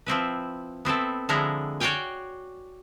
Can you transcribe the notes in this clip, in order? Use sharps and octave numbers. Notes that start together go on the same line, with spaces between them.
F3 C4 E4 B4
B3 C4 E4 A4
D3 F3 G#3 E4 A#5
F#4 C#5 D5 F5 G5 G#5